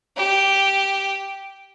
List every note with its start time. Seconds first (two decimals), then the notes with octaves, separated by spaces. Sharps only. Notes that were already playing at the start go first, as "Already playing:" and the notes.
0.17 G4